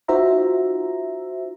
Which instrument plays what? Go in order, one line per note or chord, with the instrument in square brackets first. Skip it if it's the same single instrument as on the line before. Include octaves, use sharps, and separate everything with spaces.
[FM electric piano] D#4 F4 F#4 C5 E5 A#5